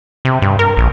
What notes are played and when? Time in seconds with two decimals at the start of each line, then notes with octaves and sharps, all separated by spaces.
0.25 C3
0.42 G2
0.59 A#4
0.77 A#1